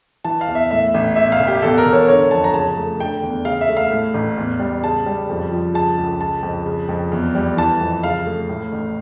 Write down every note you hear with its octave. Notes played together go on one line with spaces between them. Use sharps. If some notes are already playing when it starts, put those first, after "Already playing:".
E3 A5
F5
E2
E5
A2 E5
A1
E2 E5
F5
E1
G4
E2 A4
A#4
E1
C#5
D3 C#5
F2 A5
A#5
C#3 A5
A3
D3 G5
E2
C#3 F5
E5
A3
F5
A2
A1
E2
G3
C#3 A5
G3
F2
F3
C#3 A5
C#2
C#3 A5
F2
C#3
F2
E2
G3
E3 A5
F2
C#3 F5
A3
A2
A1